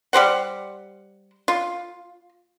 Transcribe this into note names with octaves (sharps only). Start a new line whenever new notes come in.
G3 G4 C5 F#5
F4